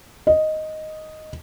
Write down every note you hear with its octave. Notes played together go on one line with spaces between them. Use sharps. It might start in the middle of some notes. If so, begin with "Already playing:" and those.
D#5